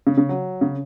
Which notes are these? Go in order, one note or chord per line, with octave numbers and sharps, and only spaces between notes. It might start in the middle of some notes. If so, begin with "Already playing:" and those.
C#3
C#3
F#3
C#3